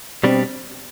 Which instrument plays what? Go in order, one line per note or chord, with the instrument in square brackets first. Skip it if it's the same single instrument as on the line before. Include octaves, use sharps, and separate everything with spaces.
[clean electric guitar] B2 G3 D4 [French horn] C4